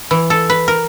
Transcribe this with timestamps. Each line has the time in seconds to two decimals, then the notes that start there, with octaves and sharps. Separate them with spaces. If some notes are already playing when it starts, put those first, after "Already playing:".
0.11 E3
0.30 A4
0.50 B4
0.68 A#4